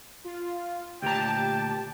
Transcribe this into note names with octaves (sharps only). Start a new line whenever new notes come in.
F4
D2 A#2 G4 G5 A5 A#5